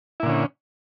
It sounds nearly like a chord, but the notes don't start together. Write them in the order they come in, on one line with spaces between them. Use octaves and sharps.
E4 A#2 D3 C#4